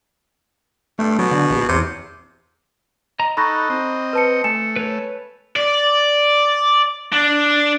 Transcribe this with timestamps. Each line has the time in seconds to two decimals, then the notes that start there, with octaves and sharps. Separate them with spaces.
0.99 G2 A3
1.19 B2 F#3
1.31 D3
1.50 A#1
1.69 E2 C3
3.19 D#5 A#5
3.37 D#4 A4 A#5 B5 C#6 F#6 G6 A#6
3.70 C4 D#5
4.13 B4 A5 C#7
4.44 A3 G#5 C#7 E7
4.76 B4 C#5
5.56 D5
7.12 D4